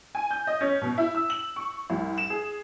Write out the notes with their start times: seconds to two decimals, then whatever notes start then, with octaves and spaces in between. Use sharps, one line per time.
0.15 G#5
0.31 G6
0.47 D#5
0.61 C#4
0.81 B2
0.97 E4
1.15 E6
1.30 F#7
1.56 C#6
1.90 C2
2.18 E7
2.30 G#4